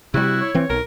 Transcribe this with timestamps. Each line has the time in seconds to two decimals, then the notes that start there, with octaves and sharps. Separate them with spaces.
0.14 C3 G3 E4 F#4
0.41 C#5
0.55 E3 C4
0.70 B1 A#4